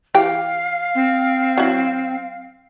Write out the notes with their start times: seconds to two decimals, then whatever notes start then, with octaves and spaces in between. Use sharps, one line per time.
0.15 E3 G4 F5 G5
0.95 C4
1.58 F#3 E4